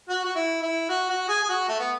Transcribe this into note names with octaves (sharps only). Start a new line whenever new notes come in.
F#4
F#4
E4
E4
F#4
F#4
G#4
G#4
F#4
A3
B3